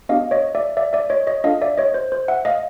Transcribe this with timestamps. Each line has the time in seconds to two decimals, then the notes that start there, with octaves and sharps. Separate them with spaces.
0.09 B3 D4 G4 D#5 F5
0.31 C#5 D#5
0.55 D5 E5
0.77 D5 E5
0.93 D5 E5
1.10 C#5 D#5
1.27 C#5 D#5
1.44 D4 F4 A4 D#5 F5
1.62 D5 E5
1.78 C#5 D#5
1.94 C5
2.12 C5
2.28 E5 F#5
2.45 D#5 F5